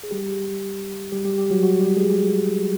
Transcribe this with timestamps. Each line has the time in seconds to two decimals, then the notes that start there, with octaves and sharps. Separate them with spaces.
0.03 G#4
0.11 G3 G4
1.12 G3 G4
1.25 G3 G4
1.38 G3 G4
1.50 F#3 F#4
1.63 F#3 F#4
1.80 G3 G4
1.97 G#3 G#4